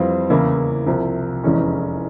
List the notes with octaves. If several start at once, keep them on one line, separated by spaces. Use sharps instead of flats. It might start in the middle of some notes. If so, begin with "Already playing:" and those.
Already playing: F2 E3 G3 C4 F4
E2 C#3 E3 A#3 E4
C2 C3 F3
F1 E2 E3 G#3 C#4